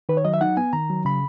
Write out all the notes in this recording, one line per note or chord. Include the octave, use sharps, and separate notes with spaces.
D#3 B4
C#5
F#3 D#5
E5
D#4 F#5
B3 G#5
D#3 A#5
F#3
C#3 B5